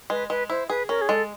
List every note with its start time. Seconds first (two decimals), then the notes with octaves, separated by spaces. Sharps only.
0.10 G#3 B4
0.30 G#3 B4
0.50 E4 C5
0.69 G#4 B4
0.89 C#4 A#4
1.01 G#4
1.08 G#3 A4